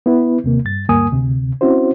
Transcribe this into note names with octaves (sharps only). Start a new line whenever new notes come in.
B3 E4 B4
D#2 C3 A#3
G2 A6
D2 G2 A#3 G#5 D#6
D2 C3
C4 C#4 E4 F#4 C5